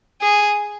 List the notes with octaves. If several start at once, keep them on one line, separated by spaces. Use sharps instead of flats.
G#4